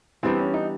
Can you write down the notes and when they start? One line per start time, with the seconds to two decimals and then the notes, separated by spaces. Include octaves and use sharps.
0.23 E3 G3 B3 C4 D4
0.39 C#4
0.54 D#4